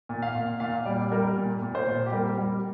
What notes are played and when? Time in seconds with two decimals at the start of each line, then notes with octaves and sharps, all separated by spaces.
0.09 A#2
0.22 F5
0.35 A#2
0.60 A#2 F5
0.86 G3 D5
1.12 G3 A#4
1.36 A#2
1.62 A#2
1.75 C5
1.87 A#2
2.06 G4
2.12 G3 A#4
2.38 G3